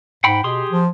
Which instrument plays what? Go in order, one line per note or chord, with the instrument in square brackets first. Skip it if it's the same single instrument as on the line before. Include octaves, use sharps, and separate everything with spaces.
[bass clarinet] G#2 [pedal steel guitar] F#5 G5 B5
[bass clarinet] B2 [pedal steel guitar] G4 G#4 C6
[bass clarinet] F3